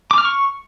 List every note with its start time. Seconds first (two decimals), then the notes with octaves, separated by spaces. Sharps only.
0.11 D6
0.18 F6
0.25 C#6